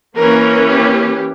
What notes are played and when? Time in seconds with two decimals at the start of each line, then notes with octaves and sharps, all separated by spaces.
0.16 E3 A#3 C#4 A#4
0.67 G4